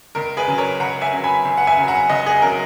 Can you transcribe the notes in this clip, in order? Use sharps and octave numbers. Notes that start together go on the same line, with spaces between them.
C#2 A#4
G#4 B4
C#3 F#3
A#4 C#5
C#2 F#5 A#5
E5 G#5
C#3 F#3
G#5 B5
C#2
F#5
E5 G#5
C#3 F#3
F#5 A#5
C#2 D#5 F#5
G#4
C#3 F#3 A#4